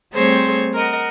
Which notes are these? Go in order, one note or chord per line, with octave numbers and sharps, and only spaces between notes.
G3 A3 C4 G#4 C5 C#5
A#4 D#5 F#5